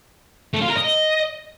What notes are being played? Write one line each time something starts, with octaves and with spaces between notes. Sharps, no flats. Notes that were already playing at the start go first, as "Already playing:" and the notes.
A3
F4
A#4
D#5